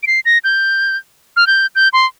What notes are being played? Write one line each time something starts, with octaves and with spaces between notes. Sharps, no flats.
D7
C7
A#6
G6
F6
G6
G6
C6